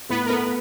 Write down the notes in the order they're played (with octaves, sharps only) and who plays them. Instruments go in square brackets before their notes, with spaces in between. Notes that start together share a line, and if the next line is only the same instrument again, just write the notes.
[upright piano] A2 [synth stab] B3 B4
[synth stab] A#4
[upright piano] A3 [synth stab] B3 B4